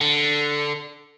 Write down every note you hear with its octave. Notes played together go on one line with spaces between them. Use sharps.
D3